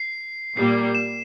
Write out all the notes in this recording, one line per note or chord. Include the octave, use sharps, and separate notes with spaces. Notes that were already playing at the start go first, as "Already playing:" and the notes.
Already playing: C7
A#2 G3 A#3 C7
E7